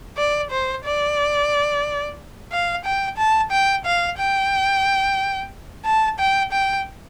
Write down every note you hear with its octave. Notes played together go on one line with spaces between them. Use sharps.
D5
C5
D5
F5
G5
A5
G5
F5
G5
A5
G5
G5